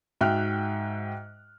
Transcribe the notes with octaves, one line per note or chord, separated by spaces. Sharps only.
G#2 F#4 E5 G5 F6 F#6